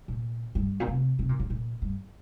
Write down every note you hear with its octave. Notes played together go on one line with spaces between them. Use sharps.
A#2
G2
A#2
C3
C3
A#2
A#2
A#2
G2